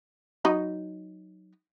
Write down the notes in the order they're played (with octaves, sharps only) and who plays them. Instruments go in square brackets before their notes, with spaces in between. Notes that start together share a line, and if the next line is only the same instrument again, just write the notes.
[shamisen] F#3 D#4 B5